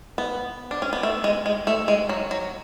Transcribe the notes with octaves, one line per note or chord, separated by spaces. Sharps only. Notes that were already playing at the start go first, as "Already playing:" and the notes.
B3
D4
C#4
B3
A3
G#3
G#3
A3
G#3
F#3
F#3